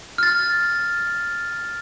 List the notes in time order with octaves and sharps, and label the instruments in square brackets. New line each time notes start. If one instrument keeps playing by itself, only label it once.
[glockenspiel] F6 A6